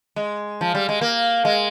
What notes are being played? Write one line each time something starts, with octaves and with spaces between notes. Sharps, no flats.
G#3
F3
G3
G#3
A#3
G#3